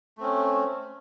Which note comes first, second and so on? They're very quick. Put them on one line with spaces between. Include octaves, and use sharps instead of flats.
A3 C4 C#4